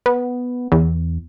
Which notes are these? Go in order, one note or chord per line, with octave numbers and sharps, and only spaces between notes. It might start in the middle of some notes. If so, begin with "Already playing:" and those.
B3
E2